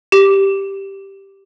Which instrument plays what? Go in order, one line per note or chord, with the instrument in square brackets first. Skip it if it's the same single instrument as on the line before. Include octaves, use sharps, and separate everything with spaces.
[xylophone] G4